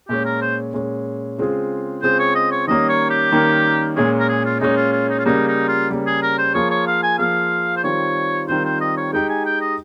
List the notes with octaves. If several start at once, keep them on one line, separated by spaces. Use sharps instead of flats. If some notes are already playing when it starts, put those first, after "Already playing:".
A#2 G#3 C#4 G4
A#4
C5
A#2 G#3 C#4
C#3 G#3 C4 F4 G#4
C#3 G#3 C4 F4 G#4 C5
C#5
D#5
C#5
D#3 G3 A#3 C#4 D#5
C#5
G4
D#3 G3 A#3 C#4
A#2 G#3 C#4 G#4
A#4
G#4
F4
A#2 G#3 C#4 D#4
F4
F4
D#4
F4
C#3 G3 A#3 D#4
D#4
F4
C#3 G3 A#3
G#4
A#4
C5
F3 A#3 F4 G#4 C#5
C#5
F5
G#5
F3 A#3 F4 G#4 F5
C5
D#3 G3 C4 F4 C#5
D#3 G3 C4 F4 C5
C5
D#5
C#5
G#3 D#4 G4 G5
G#5
G5
D#5